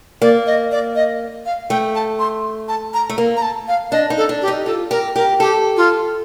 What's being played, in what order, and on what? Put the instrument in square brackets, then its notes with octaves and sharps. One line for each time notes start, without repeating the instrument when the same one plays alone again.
[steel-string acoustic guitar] A#3 [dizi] D5
[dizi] D#5
D5
D#5
F5
[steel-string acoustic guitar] A3 [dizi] G5
[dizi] A5
C6
A5
A#5
[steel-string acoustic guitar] A3
A#3
[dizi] A#5
A5
F5
[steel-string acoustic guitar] D4 [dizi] D#5
[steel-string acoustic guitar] D#4
[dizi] A4
[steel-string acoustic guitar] D4
[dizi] G4
[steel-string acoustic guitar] D#4
[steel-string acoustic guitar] F4 [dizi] A4
[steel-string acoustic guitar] G4 [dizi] A#4
[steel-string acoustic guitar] G4 [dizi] A#4
[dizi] G4 [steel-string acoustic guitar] A4
[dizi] F4